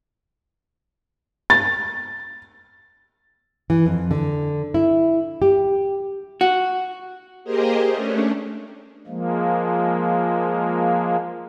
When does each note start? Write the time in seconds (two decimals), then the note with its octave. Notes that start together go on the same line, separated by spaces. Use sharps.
1.50 A6
3.70 E3
3.85 F2
4.11 D3
4.74 E4
5.42 G4
6.41 F#4
7.44 A#3 G4 G#4 A#4 C5 D#5
7.90 A3 C#4 D4
9.07 F3 G#3 A#3